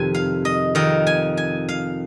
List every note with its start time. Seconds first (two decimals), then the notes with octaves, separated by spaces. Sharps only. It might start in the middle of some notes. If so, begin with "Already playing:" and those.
Already playing: F2 C3 D#3 G#5
0.14 F5
0.45 D#5
0.75 F2 D#3 D#5
1.07 G#5
1.37 G#5
1.69 F5